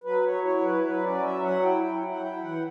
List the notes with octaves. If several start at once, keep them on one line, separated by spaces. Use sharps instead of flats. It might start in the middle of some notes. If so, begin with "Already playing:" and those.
F#3 B4
F#3 C#5
E4 C#5
F#3 B4
F#3 B4
C#4 D5
F#3 E5
F#3 F#5
E4 G5
F#3 G5
E4
F#5
E4 G5
E3 F#5